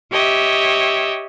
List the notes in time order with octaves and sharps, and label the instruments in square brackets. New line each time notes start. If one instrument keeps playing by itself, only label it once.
[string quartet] G4 C#5 D#5 E5